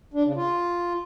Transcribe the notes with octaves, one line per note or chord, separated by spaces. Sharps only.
D4
C#3
F4